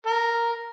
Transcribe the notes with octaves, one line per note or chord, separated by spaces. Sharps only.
A#4